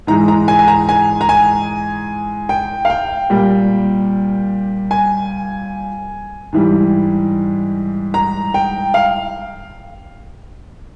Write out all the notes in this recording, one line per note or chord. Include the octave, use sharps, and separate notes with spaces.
G#2 E3 G#3 A#5
A#5
G#5
G#5
A#5
G#5
A#5
G#5
G5
F5
G5
A#2 G3
G#5
G#2 E3 G3
A#5
G5
F5